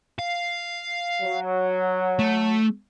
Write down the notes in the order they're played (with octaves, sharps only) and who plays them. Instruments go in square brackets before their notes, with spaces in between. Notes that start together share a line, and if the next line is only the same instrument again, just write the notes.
[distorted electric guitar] F5
[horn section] F#3
[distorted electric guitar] A3